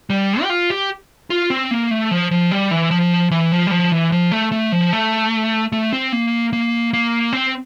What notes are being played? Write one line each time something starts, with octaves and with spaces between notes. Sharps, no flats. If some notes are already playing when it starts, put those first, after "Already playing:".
G3
G4
F4
G4
F4
C4
A#3
A3
F3
F3
G3
E3
F3
E3
F3
G3
F3
E3
F3
A3
A3
F3
A3
A3
C4
A#3
A#3
A#3
C4